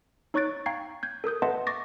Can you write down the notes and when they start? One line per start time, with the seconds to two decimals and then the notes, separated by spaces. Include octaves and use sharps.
0.34 D#4 C#5 C#6 F#6 A6 D7
0.66 F5 G5 A#5 C#6 G#6 C7
1.03 G6 G#6
1.24 A4 A#4 D#6 G6
1.42 B4 D#5 E5 F#5 A5 C6
1.67 C#6 D6 A6 A#6